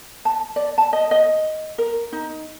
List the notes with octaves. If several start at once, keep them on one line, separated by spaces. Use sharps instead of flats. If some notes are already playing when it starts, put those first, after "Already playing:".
A5
D5
A5
D#5
D#5
A#4
D#4